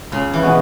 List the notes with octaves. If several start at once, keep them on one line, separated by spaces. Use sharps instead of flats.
C#2 C#3
E3
B2 G#3 B3 F#4